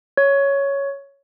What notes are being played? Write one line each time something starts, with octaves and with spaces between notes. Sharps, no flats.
C#5